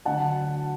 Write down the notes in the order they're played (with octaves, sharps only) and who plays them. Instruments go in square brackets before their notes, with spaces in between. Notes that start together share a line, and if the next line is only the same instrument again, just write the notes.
[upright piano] D2 D3 F#3 F#5 A5